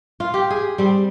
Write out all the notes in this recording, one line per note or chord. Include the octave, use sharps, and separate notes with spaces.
F4
G4
G#4
G3 C4